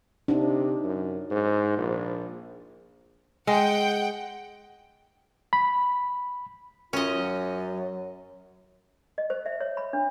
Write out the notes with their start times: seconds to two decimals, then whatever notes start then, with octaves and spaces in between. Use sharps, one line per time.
0.28 C3 D4 D#4
0.84 F#2
1.31 G#2
1.77 A#1
3.47 G#3 F#5 G5
5.53 B5
6.93 F#2 C#4 F4 D#5
7.15 F#3
9.18 D#5
9.30 C5
9.46 E5
9.60 C#5
9.77 B5
9.93 D4